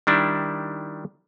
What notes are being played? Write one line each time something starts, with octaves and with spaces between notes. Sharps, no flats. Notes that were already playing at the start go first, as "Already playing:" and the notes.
D#3 G3 D4 E4